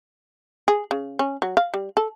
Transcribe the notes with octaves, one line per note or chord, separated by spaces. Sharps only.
G#4
C#3
C#4
F#3
F5
G3
A4